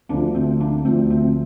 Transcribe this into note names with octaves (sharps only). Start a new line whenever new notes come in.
D2 D3 F3 A#3 D4
A3 C4
A#3 D4
D2 D3 F3 A3 C4
A3 C4